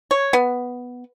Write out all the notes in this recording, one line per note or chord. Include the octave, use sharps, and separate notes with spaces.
C#5
B3